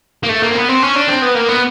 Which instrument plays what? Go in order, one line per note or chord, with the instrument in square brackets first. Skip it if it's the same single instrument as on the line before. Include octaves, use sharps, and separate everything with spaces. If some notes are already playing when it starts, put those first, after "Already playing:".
[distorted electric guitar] A#3
A3
A#3
C4
B3
C4
C#4
D4
C4
B3
A#3
B3